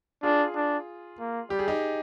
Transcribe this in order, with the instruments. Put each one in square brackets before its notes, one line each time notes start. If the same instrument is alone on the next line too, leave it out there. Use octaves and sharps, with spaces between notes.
[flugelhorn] D4 [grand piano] F4 G#4
[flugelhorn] D4
A#3
[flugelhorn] G3 [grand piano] G4
[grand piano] G#4
D#4 G4